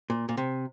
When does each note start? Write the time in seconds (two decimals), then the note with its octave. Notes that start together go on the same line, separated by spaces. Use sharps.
0.10 A#2
0.29 A#2
0.37 C3